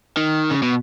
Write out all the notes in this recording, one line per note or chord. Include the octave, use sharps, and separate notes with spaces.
D#3
C#3
B2